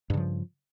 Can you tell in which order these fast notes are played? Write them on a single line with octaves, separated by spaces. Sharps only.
G2 C#3 F3